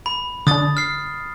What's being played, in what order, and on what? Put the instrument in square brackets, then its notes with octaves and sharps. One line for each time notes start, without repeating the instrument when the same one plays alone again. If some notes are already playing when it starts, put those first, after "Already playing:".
[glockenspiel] B5
[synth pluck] D3 D4 [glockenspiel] D#6 A6
[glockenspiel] F6 C7